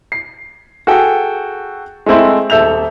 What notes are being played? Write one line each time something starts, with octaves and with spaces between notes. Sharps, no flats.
C7
F#4 G#4 A4 G5
G#3 A3 C4 E4
D#1 A4 E5 G6 F7